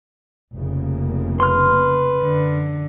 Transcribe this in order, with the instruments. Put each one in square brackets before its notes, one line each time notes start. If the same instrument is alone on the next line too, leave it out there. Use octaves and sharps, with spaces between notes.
[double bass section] F1 C#3 A#3
[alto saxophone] B4 [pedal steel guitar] C6 F6
[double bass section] F#2 [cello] D3